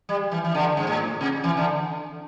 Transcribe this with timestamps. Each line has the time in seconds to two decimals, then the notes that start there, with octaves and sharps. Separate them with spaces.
0.09 G3
0.32 E3
0.44 E3
0.55 D3
0.77 G2
0.87 A2
1.21 C3
1.44 E3
1.57 D3